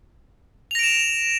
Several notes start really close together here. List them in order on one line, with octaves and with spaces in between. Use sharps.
F7 A#6 D7 E7